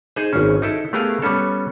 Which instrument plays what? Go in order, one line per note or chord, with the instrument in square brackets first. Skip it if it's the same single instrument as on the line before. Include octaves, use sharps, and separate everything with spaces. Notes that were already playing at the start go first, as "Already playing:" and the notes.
[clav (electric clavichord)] D#4 G#4 C5
G#1 C#4
D#4 E4 A4
A3 B3 G4 G#4 A#4 F5
G3 B3 C#4 A4